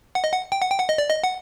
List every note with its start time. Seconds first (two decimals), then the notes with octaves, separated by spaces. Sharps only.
0.15 F#5
0.24 D#5
0.32 F#5
0.52 G5
0.62 F#5
0.70 G5
0.79 F#5
0.89 D#5
0.98 D5
1.10 D#5
1.24 F#5